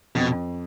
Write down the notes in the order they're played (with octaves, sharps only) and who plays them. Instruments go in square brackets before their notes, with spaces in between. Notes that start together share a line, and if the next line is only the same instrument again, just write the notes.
[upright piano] F2 [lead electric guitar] B2